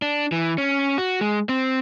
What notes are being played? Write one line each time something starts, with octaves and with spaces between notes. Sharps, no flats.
D4
E3
C#4
F#4
G#3
C4